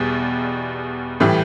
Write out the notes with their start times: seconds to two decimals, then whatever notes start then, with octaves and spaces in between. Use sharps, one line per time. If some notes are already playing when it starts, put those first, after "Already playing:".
Already playing: E2 B2 G3
1.20 A2 E3 G3